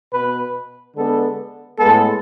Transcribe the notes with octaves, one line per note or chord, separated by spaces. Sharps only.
B2 B3 B4
D3 G#3 B3 A4
A2 G#3 B3 A4